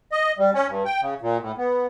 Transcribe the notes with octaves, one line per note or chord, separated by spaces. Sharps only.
D#5
G3
C#4
G2
G5
C#3
A#2
A2
B3